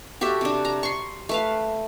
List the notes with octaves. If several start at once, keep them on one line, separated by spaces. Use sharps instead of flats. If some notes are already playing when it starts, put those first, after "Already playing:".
F#4 G4 A4 E5
C3 D4
A#5
C6 C#6
A3 B4 F5